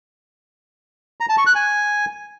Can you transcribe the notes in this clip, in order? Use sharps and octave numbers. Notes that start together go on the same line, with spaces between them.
A#5
A5
C#6
F#6
G#5